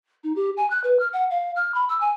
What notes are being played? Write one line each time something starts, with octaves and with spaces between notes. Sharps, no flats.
D#4
G4
G#5
F#6
B4
F6
F#5
F5
F6
B5
E6
G#5